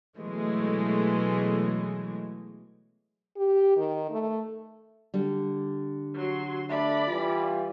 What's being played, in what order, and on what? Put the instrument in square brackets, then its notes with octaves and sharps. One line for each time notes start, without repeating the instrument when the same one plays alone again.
[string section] B2 E3 F#3 G#3 A3
[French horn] G4
D#3
A3
[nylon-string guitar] D3 G3
[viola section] F#3 C6
[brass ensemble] A3 D4 E5 [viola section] D5 B5
[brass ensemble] E3 G3 F4